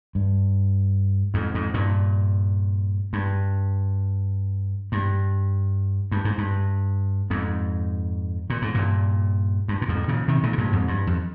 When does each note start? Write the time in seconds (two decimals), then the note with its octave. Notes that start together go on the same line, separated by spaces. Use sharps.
0.15 G2
1.34 F2 G#2
1.54 F2 G#2
1.74 G2 A#2
3.13 G2
4.92 G2
6.12 G2
6.25 G#2
6.38 G2
7.30 F2 G#2
8.50 A#2
8.62 G#2
8.74 G2 A#2
9.68 G2
9.82 A#2
9.88 F2 G#2
10.08 A#2 C#3
10.28 C3 D#3
10.43 A#2 C#3
10.53 C3
10.58 G2 A#2
10.73 F2 G#2
10.88 G2
11.07 F2